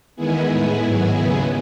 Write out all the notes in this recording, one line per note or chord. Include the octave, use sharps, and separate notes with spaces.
E2 D#3 G#3 B3 E4 G#4
A2 G#3 B3
G#2 D#3 F#3 B3
D#2 C#3 G#3 B3